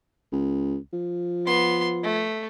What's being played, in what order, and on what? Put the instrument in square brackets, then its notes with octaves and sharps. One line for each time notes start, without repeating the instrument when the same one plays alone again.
[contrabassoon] C#2
F3
[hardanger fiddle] B3 C6
A3